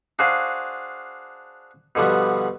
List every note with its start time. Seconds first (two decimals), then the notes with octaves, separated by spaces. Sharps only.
0.19 D4 F#4 G#4 C5 F5 C6
1.95 B2 D3 F3 G3 B3